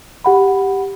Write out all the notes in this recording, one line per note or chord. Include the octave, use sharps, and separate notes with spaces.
G4 F#5 B5